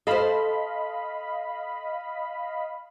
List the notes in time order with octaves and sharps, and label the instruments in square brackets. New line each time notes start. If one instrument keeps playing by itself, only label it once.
[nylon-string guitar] A4 C5 [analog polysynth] D#5 F5 B5